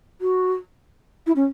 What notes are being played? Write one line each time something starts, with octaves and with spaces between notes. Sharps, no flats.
F#4
E4
C#4